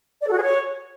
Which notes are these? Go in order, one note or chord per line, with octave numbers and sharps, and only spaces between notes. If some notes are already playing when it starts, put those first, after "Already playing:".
D5
A4
F#4
G#4
C#5